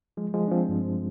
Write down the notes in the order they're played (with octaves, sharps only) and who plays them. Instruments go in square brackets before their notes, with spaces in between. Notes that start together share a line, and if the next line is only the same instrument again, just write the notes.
[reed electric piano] F3 G#3
F3 G#3
D4
F3 C4
G2